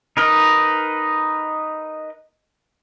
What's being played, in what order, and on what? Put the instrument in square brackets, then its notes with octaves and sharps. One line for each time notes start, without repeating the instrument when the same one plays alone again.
[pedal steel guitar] D#4 A#4 B4 D#5